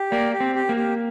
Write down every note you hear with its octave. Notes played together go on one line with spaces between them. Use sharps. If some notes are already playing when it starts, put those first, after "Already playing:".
Already playing: G4
A#3 D5
G4
C4
G4
A#3
G4